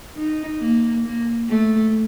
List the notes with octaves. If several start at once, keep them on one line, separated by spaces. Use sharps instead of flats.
D#4
A#3
A#3
A3